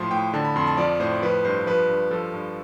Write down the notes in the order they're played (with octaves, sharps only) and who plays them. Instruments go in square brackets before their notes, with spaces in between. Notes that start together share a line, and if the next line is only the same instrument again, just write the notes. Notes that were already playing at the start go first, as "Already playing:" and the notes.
Already playing: [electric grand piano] A2 F3 C6
A2 G5
D3 A5
B5
F2 C6
A5
F3 D5
A2 C5
F3 B4
G2 C5
F3 B4
G2
F3 A4
G2